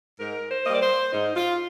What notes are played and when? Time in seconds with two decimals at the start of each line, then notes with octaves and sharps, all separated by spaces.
0.18 G#2 A#4
0.50 C5
0.65 A#3 D#5
0.69 G3 D5
0.82 C5
1.13 G#2 D#4
1.35 F4